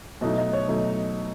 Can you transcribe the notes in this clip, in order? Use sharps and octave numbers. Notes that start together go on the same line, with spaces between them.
B2 F#3 A3 D#4 D#5
D#5
C#5
B2 F#3 A3 D#4